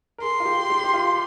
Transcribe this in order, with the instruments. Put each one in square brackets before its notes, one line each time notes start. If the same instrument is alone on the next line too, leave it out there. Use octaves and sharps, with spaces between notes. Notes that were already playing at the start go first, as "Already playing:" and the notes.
[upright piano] A#4
[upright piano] G#4 [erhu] C6
[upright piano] F4
G4
G4
G4
F4